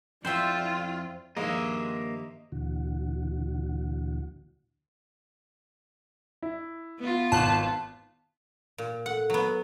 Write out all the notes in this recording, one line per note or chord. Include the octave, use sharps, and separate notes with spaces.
F2 E4 F4 C5 D5 E5 G5
G2 D#3 F3 G#3 A#3 D#5 E5
D2 A#2 D3 E3 F#4
E4
B3 F4
G#1 A5 F#6 F#7
A#2
A4 F#5
F#3 B3